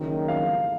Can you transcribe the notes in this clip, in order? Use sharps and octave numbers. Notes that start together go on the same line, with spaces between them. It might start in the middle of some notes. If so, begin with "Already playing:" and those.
Already playing: F#1 F#2 D#3
F5